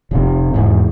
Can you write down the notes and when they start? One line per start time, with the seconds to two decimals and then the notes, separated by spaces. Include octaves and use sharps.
0.11 F1 C3
0.54 E2 G#2